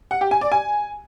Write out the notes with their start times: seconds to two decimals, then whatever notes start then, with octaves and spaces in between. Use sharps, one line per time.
0.11 F#5
0.21 G4
0.31 G#5
0.41 D5
0.52 G#5